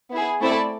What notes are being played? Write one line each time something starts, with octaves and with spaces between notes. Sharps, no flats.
B3 E4 G#4
A3 C4 E4 A4 D5